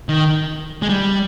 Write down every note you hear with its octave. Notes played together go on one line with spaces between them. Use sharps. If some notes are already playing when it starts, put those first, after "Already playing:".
D#3
G#3
G3